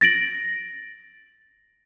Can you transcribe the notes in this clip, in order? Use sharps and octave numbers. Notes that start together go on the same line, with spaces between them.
A6 A#6 D7 F#7